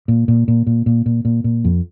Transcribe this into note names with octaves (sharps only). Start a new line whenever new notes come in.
A#2
A#2
A#2
A#2
A#2
A#2
A#2
A#2
F2